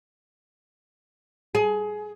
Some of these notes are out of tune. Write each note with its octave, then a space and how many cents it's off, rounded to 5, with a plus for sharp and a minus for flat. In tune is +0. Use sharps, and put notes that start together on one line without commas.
G#4 +20